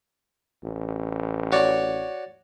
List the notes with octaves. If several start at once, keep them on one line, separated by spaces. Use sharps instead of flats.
A1
F#4 C#5 D5